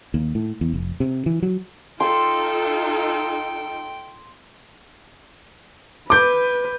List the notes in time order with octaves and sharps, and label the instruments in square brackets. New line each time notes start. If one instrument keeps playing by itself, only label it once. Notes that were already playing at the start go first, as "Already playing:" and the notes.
[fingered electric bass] D#2
A2
E2
F1
C3
E3
F#3
[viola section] D#4 F4 A4 [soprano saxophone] G5 [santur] C6
[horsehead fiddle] B4 [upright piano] D6 G6